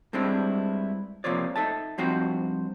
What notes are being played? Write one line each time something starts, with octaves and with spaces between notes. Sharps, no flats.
G2 G3 G#3 C4 D4 E4
C3 F3 A#3 C4 C#5 D5
D#4 A4 E5 A5
G2 F3 C4 D#4 F#4 C5